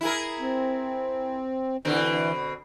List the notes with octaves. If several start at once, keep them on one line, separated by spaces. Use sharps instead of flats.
E4 G#4 A#4
C4
B2 D3 E3 C4